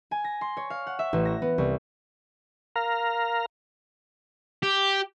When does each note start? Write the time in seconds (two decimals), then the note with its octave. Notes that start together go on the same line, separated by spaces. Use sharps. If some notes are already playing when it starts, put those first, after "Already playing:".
0.11 G#5
0.24 A#6
0.41 C6
0.57 C#5
0.70 F5
0.87 F#5
0.99 E5
1.13 A1
1.25 A#6
1.42 B3
1.58 C2
2.76 A#4 F5 A#5
4.63 G4